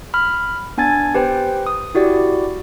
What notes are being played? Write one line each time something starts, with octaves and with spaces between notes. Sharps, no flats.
B5 F6
B3 D4 G#5 G#6 A6
G4 B4 C5 G5
D#6
E4 F#4 G4 D5